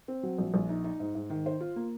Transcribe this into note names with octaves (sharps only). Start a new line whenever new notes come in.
C4
F#3
A#1
A#1
D#4
D#4
G#2
G#2
D#3
C5
F4
A#3